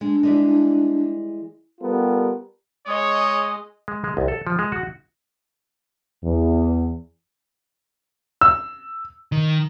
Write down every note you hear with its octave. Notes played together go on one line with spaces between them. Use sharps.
G#3 D4
E3 G3 G#3
G3 B3 F4 G4 A4 A#4
G#3 G#4 C#5 D#5
G#3
G#3
C2
A4
F3
G#3
F#4
E2
E6
D#3